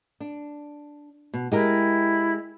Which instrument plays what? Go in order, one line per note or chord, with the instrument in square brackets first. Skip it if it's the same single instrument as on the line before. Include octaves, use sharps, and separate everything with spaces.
[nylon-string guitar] D4
B2
[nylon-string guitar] G#3 G4 A#4 [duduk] E4